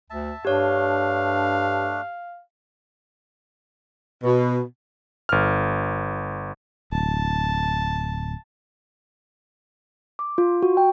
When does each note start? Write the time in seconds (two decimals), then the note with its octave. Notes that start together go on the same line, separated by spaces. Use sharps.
0.10 D2 E5 A5
0.45 G2 A3 D4 G4 C#5 F5
4.24 B2
5.29 G1 F6
6.92 D1 A5
10.19 D6
10.38 F4
10.63 F#4
10.77 G5